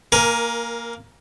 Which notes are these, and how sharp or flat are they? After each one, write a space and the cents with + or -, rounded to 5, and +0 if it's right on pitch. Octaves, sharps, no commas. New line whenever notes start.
A#3 -5 A#4 +20 G#5 +0